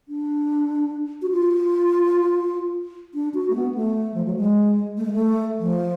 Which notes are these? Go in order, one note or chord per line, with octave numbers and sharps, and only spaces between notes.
D4
F#4
F4
D4
F#4
A3
B3
A3
F3
F#3
G#3
A3
G#3
A3
F3